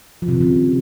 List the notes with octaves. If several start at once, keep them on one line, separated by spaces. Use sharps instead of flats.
F3
C3
D#3
C#3